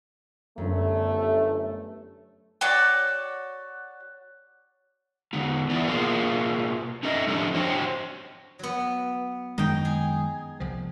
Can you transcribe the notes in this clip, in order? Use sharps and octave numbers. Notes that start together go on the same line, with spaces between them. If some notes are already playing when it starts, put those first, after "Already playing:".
G1 F#2 A3
F#4 C#5 D5
D3 B3 D#4
E3 B3 E4 D5
B2 A#3 F4 G#4
C#4 D#4 A4 D#5
A2 F3 G3 C#4 D4 A4
D4 F#4 C5 C#5 G5
F#3 B3
F#2 D#3 G#3 D#4 G5
G#4
C2 F3